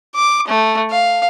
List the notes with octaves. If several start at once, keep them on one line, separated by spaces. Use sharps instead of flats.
D6
A3
F5